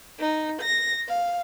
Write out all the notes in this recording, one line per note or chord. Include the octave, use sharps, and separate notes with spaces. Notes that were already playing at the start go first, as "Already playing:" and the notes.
D#4
A#6
F5